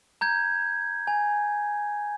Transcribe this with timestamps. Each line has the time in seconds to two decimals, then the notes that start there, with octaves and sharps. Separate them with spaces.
0.21 A#5 G6 G#6
1.07 G#5